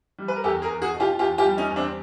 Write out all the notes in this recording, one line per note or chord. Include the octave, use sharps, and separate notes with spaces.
G3
B4
A#4
E2 G4 A4
G#4 A#4
E2
F#4 G#4
B2
F4 G4
E2 F4 G4
F4 G4
G3
C#4 D#4
E2
C4 D4